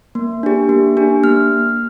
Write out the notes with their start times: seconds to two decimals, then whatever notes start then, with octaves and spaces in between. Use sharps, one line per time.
0.15 A#3
0.43 D4 G4
0.69 A#3
0.97 D4 G4
1.23 A#3 F6